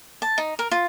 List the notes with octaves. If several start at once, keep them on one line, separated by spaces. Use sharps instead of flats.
A5
D#4
A#4
F4